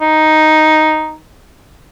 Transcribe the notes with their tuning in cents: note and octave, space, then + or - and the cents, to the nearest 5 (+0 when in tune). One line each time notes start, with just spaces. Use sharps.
D#4 +0